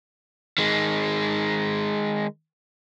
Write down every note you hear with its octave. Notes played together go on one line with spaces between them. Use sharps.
D#3 G#3